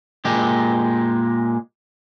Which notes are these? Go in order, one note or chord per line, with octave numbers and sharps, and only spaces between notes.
A#2 G#3 G4